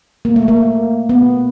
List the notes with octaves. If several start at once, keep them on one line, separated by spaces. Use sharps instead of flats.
A#3
A3
A#3
B3